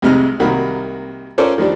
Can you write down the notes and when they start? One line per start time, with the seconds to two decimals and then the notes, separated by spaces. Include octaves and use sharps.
0.02 C2 F2 C3 G#3 D#4 F6
0.40 C2 D#3 A#3 F#4 B5
1.38 C#4 F4 A4 A#4 C5 D5
1.58 D#3 F3 G3 D4